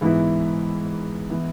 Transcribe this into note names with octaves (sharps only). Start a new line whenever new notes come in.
G#2 E3 B3 E4
E3 B3 E4